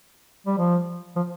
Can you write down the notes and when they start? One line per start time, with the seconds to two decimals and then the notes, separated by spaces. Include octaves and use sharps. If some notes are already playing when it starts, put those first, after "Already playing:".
0.47 G3
0.58 F3
1.16 F3